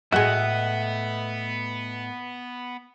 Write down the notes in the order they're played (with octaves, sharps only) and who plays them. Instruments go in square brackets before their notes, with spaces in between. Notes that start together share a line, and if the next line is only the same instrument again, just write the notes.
[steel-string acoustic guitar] A2 A3 D#5 [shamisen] F#3 G#3 [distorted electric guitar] B3 [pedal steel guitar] E5 F#5